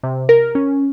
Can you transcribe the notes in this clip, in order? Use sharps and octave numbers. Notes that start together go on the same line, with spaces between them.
C3
A#4
C#4